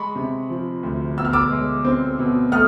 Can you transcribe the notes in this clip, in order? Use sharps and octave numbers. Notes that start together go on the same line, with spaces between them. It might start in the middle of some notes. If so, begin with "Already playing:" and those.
Already playing: G#3 B5 C#6
C3
F3
D2
B2 E6
F6
D6 E6
G#3
C4
B2
A3 D#6 F6